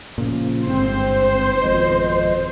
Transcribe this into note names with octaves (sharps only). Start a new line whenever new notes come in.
A#2 C#3 F3
G1 G#2 C4 C5
G#1 F2 B2 D#5